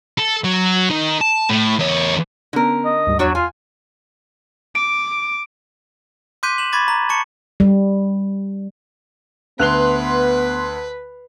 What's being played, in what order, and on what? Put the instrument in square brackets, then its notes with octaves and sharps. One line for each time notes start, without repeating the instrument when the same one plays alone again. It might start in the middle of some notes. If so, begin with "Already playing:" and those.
[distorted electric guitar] A4
F#3
D#3
A5
A2
E2 C#5
[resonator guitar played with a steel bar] D3 A#4 [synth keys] B3 C#4 D4
[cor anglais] D#5
[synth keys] D2 G#2 G3
[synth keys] E2 [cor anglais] F#3 [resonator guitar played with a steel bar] D4 F#4 C#5
[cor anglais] F4 [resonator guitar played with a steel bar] G#5
[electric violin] D6 [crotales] D7
[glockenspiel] C6 D6 F#6 G6 B6 D#7
E7 F#7
B5 C#6 D6 G#6 A6
A#5
A5 C#6 C#7
[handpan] G3
[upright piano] D2 F7 G7 [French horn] B3 [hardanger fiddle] B4 [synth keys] C6 F#6